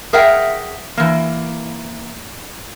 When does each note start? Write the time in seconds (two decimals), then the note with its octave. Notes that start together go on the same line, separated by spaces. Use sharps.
0.13 G#4 A#4 E5 F#5 G5
0.97 E3 A#3